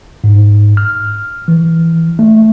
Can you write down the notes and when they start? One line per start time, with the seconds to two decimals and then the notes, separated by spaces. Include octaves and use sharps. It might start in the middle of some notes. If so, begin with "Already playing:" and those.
0.24 G#2
0.77 F6
1.48 E3
2.19 A3